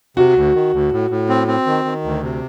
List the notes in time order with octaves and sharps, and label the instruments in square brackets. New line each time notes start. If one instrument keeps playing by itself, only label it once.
[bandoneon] C3 [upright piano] F#4
[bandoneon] D2
D#3
D2
A2
A2
C4
C4
D#3
D#3
D2
C3